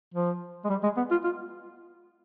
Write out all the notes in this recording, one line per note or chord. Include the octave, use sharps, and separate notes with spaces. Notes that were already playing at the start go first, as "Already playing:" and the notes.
F3
G#3
G3
G#3
B3
F4
F4